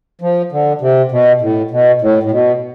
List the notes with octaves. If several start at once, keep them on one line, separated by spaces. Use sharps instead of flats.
F3
D3
C3
B2
A2
B2
A2
A2
B2